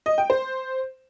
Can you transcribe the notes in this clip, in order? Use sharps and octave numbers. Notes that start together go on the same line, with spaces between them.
D#5
G5
C5